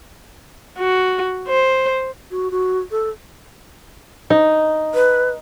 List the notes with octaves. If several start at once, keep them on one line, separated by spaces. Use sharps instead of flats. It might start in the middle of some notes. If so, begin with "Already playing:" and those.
F#4
C5
F#4
F#4
A4
D#4
B4